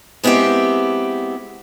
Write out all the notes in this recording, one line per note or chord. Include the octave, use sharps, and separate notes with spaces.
G#3 B3 C4 E4 G4